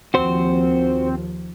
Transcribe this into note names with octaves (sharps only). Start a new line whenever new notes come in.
D#2 F3 C4 F#4 C5